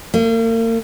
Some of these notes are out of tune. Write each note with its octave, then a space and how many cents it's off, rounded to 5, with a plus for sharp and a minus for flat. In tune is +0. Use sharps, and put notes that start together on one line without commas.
A#3 -40